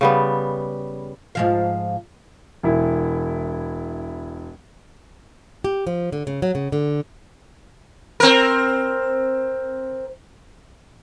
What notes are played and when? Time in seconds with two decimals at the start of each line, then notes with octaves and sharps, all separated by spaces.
0.01 C#3 G3 B3
1.35 G#2 F3 F5
2.63 E1 E4
5.64 G4
5.87 F3
6.12 D3
6.27 C#3
6.42 F#3
6.55 C#3
6.72 D3
8.20 C4 A#4